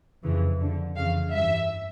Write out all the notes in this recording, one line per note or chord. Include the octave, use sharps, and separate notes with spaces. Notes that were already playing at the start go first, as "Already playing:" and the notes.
F2 C#3 E3
F2 D3
F2 C#3 E3 F5
G2 E5
E3